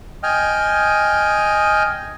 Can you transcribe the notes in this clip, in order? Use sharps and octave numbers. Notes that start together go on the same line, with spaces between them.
D#5 G5 G#5 F6